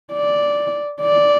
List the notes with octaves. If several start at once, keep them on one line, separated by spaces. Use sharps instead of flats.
D5
D5